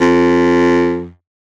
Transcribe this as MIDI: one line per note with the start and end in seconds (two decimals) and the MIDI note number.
0.01 1.10 41